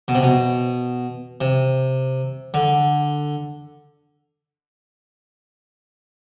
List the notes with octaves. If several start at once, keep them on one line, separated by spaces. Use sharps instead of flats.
B2
C3
B2
C3
D3